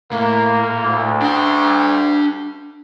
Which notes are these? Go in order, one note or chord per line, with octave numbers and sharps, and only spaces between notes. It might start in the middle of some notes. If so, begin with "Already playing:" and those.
A2 A#3
D2
D4 G5